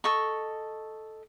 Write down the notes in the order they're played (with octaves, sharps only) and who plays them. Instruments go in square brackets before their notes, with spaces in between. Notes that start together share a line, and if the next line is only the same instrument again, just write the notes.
[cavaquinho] A4 D#5 C#6